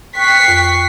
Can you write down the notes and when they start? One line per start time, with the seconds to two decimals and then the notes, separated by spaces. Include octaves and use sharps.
0.16 G5 C#6 F#6 B6 C7
0.48 F2